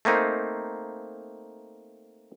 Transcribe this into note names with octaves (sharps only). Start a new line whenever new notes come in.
A3 A#3 C4 D#4